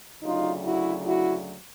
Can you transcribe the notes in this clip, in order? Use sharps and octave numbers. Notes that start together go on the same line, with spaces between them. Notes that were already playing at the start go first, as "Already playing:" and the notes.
D2 C#3 F#3 D#4 F4
E4 F#4
E4 F#4